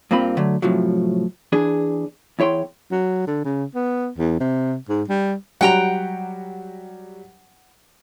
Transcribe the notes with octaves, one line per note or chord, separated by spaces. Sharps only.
G2 A#3 C4 F4 B5
D3 F#3 A3
A2 C3 F3 F#3
E2 E3 D4 G#4
E2 E4 C#5 G5 C6
F#3
D3
C#3
B3
E2
C3
G#2
G3
F#3 G3 F#4 F#5 G5 A#5